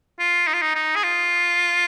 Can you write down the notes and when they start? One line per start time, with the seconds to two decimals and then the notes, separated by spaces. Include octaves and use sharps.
0.19 F4
0.47 D#4
0.54 F4
0.62 D#4
0.75 D#4
0.96 G#4
1.04 F4